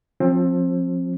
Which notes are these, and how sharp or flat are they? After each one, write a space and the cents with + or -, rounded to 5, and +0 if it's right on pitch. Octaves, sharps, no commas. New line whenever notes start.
F3 +20 C4 +25